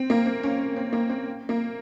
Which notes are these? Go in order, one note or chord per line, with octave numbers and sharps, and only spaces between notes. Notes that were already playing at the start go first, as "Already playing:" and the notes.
Already playing: C4
A#3
C4
C#4
C4
A#3
C4
A#3